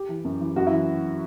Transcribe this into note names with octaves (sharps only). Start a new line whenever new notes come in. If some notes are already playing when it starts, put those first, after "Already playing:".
Already playing: G4
E3
F#2
E3
F#2 F#4
E4
E3